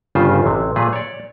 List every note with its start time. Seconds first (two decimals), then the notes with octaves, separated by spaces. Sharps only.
0.15 G1 G2 C#3 F4 C5
0.42 A1 C3
0.76 A#2 A3 G#4 B4
0.93 C#5 D5